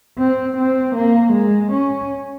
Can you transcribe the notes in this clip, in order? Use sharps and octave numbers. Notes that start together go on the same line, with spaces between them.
C4
C4
A#3
G#3
C#4